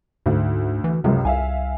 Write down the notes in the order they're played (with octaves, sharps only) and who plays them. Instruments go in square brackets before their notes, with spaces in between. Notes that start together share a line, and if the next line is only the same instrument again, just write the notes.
[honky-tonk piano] D2 [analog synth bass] G#2
[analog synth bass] E3
[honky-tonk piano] C#2 F#2 [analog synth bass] C3
[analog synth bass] C2 [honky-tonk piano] E5 F5 G#5